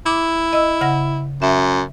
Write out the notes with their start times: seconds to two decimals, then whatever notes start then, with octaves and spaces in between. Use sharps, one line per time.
0.06 E4 D6
0.53 D#5 E6
0.81 C#3 F#5 A#6
1.42 F#2 E5